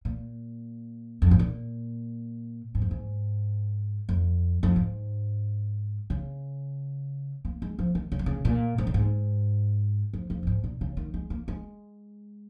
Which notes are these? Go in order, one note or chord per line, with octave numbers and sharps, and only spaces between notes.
A#2
F2
G#2
A#2
G#2
F2
G#2
F2
F2
G#2
C#3
A#3
G#3
F3
D#3
C#3
D#3
C#3
A#2
G#2
A#2
G#2
F2
F2
A#2
G#2
A#2
C#3
D#3
G#3
A#3
G#3